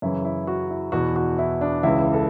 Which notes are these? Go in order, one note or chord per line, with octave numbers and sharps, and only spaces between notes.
F#2 C#3 E3 E4
E4
F#4
E4
E2 B2 F#4
F#4
E4
D4
C#2 C#3 E3 E4
A4